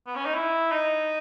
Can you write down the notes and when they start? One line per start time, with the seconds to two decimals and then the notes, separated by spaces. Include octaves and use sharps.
0.07 B3
0.16 C#4
0.26 D#4
0.35 E4
0.72 D#4